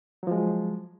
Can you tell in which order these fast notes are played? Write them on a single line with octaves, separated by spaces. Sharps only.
F#3 F3 G#3